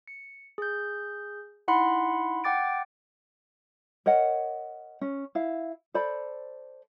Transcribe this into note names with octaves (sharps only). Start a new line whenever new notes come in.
C#7
G#4 G6
D#4 E4 F#5 B5 C6
F#5 G5 D6 A6 D7
A#4 C#5 D#5 F#5
C#4
E4 F5
A4 C5 D5 B5